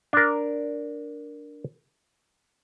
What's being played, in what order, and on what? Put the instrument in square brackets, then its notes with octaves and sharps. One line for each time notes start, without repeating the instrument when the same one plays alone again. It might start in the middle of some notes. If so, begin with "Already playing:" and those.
[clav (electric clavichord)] D4 A#4